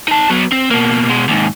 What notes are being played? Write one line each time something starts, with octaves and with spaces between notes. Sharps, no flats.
D#4 A5
F#3 B3
C4
B2 A#3
B2 G#3
D#2 G#2